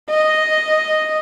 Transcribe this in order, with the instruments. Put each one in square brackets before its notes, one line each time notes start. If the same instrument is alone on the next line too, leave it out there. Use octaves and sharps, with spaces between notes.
[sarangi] D#5